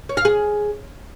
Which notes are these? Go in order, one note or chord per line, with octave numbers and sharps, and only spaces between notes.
C#5
F5
G#4